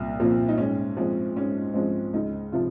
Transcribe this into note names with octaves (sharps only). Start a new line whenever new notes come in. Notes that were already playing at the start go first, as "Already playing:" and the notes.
Already playing: C2 A#2
A#2 F3 C4
D#4
G#2 C#4
F3 G#3 C4
G#2 C#4
F3 G#3 C4
C#2 D#4
C3 F3 F4